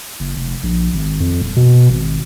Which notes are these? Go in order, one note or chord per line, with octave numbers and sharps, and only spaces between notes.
F#1
F1
A#1
G#1
F2
D#1
B2
G#1